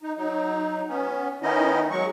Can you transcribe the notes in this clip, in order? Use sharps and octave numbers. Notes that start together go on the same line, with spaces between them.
D#4
F#3 D#4
B3 C#4
D#3 B3 C#4 D#4 E4 D#5
F#3 G#3 C#6